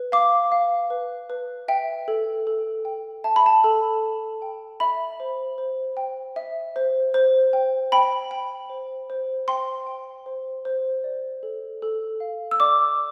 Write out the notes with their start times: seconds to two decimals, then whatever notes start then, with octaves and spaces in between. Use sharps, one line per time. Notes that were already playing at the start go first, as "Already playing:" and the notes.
Already playing: B4
0.12 F5 D6
0.52 F5
0.90 B4
1.30 B4
1.68 E5 G5
2.08 A4
2.47 A4
2.85 G5
3.24 E5 A5
3.36 B5
3.46 A5
3.64 A4
4.02 A4
4.42 G5
4.80 E5 B5
5.20 C5
5.58 C5
5.97 G5
6.36 E5
6.76 C5
7.14 C5
7.53 G5
7.92 G5 B5
8.31 G5
8.70 C5
9.10 C5
9.48 G5 C6
9.87 G5
10.26 C5
10.65 C5
11.04 D5
11.43 A4
11.82 A4
12.20 F5
12.51 E6
12.60 D5 D6